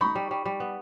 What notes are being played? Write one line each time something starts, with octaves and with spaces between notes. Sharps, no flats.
D#4 B5 C#6
G3
G3
G3
B3